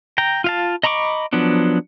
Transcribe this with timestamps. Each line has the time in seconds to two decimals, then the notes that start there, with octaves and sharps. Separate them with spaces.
0.18 G5 A#5
0.44 F4 F5 A5
0.83 D#5 A#5 B5 C#6 D6
1.33 F3 F#3 B3 D4